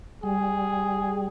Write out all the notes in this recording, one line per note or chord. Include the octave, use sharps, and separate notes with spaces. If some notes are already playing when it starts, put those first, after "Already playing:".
G3 G#4